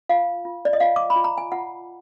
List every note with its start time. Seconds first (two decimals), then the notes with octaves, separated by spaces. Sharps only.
0.09 F4 F5
0.45 F4
0.65 D5
0.73 D#5
0.80 F4 F5
0.96 D6
1.10 B5
1.16 F4
1.24 A#5
1.38 G#5
1.52 F4 F#5